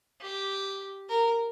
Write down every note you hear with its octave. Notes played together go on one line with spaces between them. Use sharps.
G4
A#4